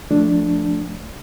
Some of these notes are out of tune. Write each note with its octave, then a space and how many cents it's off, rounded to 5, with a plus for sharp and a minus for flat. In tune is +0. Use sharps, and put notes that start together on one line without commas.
F3 +5 A3 +0 D4 +0